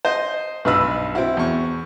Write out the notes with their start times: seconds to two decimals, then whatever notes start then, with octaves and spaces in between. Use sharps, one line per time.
0.05 C5 D#5
0.65 B1 G2 B4 D#5 B5 E6
1.15 C4 E4 F#4
1.37 E2 C#6